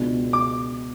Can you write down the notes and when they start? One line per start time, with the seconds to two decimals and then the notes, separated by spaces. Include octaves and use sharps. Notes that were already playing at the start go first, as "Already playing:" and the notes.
Already playing: C#2 B2 G#3 B3 D4
0.33 D6